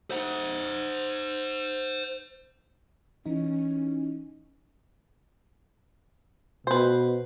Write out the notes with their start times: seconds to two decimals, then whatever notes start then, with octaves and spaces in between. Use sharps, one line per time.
0.11 C5 F#5
3.26 E3 C#4 D#4
6.67 B2 B4 C5